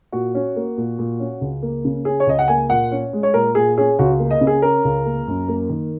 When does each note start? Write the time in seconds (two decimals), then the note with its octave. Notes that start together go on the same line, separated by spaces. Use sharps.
0.12 A#2 F#4
0.35 C#4
0.56 A#3
0.77 A#2
0.99 A#2
1.20 C#4
1.41 C#2
1.62 A#3
1.85 C#3
2.05 C#4 G#4
2.20 C#5
2.27 C#2 D#5
2.39 F#5
2.48 A#3 G#5
2.70 A#2 F#5
2.91 C#4
3.13 G#3
3.23 C#5
3.34 A#2 A#4
3.55 A#2 G#4
3.78 C#4 G#4
3.99 C#2 F#4
4.19 A#3
4.31 D#5
4.41 C#3
4.47 G#4
4.62 C#4 A#4
4.84 C#2
5.06 A#3
5.28 F#2
5.48 A#3
5.69 D#3